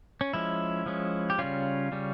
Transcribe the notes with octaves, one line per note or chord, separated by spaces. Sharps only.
C#4
F3 G#3 C#4 E4
F3 G#3 C#4
G4
C#3 G3 C#4 F4
C#3 G3 C#4